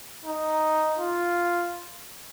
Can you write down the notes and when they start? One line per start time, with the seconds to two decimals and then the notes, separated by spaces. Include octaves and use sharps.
0.25 D#4
0.99 F4